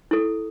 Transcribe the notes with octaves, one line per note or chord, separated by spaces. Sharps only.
E4 A4